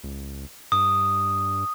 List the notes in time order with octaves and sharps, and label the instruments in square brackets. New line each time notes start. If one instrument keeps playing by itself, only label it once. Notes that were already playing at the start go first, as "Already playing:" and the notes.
[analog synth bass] C#2
[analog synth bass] G2 [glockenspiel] D#6